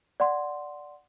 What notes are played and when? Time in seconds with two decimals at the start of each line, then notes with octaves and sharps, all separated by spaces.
0.20 D5 F#5 C6